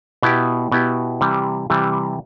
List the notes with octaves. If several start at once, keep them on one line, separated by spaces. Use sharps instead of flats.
B2 B3 E4 G4
B2 B3 E4 G4
C3 E3 G3
C3 E3 G3